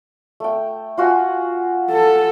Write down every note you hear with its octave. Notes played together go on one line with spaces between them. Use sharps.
A3 G5
F4 F#4 G#5
A4